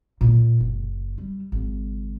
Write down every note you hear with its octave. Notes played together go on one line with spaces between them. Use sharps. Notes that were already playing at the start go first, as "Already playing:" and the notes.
A#2 A#3
F#1
G3
G#1 C#3